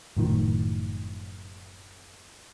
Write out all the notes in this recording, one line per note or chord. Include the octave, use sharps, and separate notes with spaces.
F#1 A2 D#3 F3